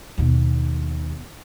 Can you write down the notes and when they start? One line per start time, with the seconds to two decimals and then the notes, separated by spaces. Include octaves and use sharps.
0.18 D#2 B2